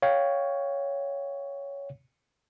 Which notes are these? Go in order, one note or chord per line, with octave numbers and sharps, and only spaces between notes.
C#5 F5 G5